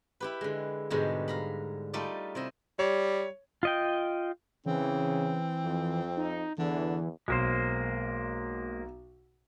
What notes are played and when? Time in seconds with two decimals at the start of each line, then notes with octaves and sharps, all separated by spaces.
0.20 E4 G4 B4
0.41 D3 G#3
0.90 G#2 B2 D3 G3 G#3
1.28 F5 A#5 B5
1.93 G3 A3 D#4 F4 A4 D5
2.35 C3 E4 C5 D#5
2.79 G3 C#5
3.63 F4 D#5 G5
4.66 C#3 E3 C4
5.64 F2
6.17 D#4
6.58 E2 D3 E3
7.28 B1 G#3 A#3 C5